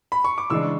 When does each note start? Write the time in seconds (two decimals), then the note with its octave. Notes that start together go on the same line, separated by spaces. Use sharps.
0.12 B5
0.25 C#6
0.38 D6
0.50 C#3 E3 G#3 D4 C#6 E6